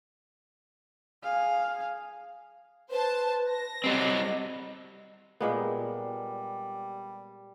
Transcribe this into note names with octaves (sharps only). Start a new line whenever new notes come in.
G#4 F5
B4 C5 A5
A#6
F#3 G3 C4 D#5
A#2 G#3 A#3 B3
G3